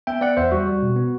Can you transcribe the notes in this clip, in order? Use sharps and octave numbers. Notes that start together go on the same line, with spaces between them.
B3 E5 G5
B3 D5 F#5
E2 C5 E5
G3 F#4
G3
B2
B3